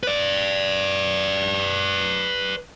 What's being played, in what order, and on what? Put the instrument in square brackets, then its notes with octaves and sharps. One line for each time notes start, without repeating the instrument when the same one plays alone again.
[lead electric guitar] B4 D5